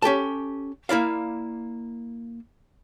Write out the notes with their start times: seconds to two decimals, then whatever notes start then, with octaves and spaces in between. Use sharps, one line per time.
0.02 C#4 G4 A4 A5
0.89 A#3 E4 D5 F5